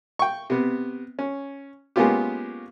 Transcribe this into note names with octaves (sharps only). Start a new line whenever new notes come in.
G5 C#6
C3 B3
C#4
G#3 A#3 B3 C#4 F4 G4